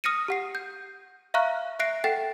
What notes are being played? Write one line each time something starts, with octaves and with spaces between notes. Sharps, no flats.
D#6 F6 A#6 C#7 D#7
G4 F#5 C7
G6
E5 F5 A#5 C#6 F6 F#6
E5 F#6 A#6 C7 D7
A4 F#5 G5 A6 C7